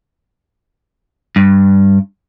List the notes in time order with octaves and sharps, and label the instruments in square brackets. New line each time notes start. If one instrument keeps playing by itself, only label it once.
[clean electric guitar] G2